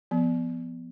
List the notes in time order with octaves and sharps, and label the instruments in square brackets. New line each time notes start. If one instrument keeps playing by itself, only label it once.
[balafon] F3 B3